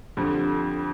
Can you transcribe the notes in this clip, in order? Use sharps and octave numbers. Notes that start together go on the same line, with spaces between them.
F2 D3 G3